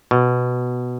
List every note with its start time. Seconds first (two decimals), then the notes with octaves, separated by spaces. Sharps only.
0.11 B2